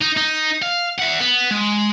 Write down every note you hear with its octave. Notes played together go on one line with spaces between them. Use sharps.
D#4
D#4
F5
E5 F#5
B3
G#3